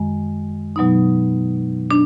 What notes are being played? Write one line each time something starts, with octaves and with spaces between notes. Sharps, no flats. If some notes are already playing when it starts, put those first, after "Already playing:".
Already playing: F#2 D#3 G#3
B2 F#3 B3 D#4
D4